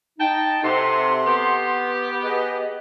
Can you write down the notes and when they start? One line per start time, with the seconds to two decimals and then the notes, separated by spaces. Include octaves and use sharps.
0.19 D#4 G5 A5
0.63 C3 A4 F#5 C6
1.26 B3 G4
2.23 G#4 B4 D#5